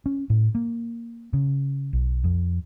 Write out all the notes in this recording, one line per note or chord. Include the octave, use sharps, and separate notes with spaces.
C#4
A2
A#3
C#3
B1
F2